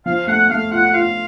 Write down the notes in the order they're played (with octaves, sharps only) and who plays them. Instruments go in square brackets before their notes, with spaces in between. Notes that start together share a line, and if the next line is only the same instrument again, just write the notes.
[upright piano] F3 [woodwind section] F5
[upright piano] A3 [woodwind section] F#5
[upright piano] A3 [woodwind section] F5
[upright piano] F4 [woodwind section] F#5
[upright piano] F4 [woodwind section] F5